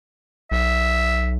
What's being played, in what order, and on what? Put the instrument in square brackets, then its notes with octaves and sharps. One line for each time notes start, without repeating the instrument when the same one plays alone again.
[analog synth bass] B1 [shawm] E5